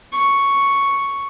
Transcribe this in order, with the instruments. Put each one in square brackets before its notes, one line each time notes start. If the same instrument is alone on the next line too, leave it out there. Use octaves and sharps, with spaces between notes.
[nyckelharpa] C#6